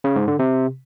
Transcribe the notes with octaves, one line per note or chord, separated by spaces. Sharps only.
C#3
G#2
D3
C3